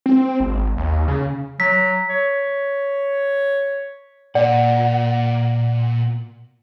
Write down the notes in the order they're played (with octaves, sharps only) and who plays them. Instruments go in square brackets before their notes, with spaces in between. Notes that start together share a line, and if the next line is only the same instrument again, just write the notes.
[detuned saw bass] C4
G#1
D#2
C#3
[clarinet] F#3 [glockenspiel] B6
[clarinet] C#5
[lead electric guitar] A#2 [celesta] D5 [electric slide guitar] F#5